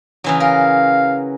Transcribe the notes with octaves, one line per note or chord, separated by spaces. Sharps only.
C#3 E3 F#3
A#4 F5